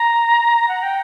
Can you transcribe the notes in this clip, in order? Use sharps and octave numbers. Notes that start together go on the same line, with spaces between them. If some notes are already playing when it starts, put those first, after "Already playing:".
Already playing: A#5
F#5
G5